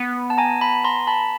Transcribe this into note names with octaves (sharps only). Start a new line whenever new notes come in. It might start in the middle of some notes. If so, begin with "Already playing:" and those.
Already playing: B3
A5
G#5 A#5
A5 B5
A#5 C6
A5 B5